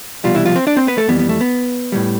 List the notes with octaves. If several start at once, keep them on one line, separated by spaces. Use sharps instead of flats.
C2 B2 F3 G3 F4
E3 E4
F3 F4
C4 C5
D4 D5
C4 C5
B3 B4
A3 A4
F2 E3 G3 B3
B3
A3
B3
A2 E3 G3